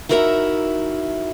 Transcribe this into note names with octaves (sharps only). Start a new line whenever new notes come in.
D#4 E4 F#4 A#4 C5 E5